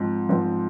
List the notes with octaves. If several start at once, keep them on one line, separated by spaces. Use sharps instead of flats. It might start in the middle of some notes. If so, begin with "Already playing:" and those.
Already playing: G#2 F3 C4
G#2 F3 C4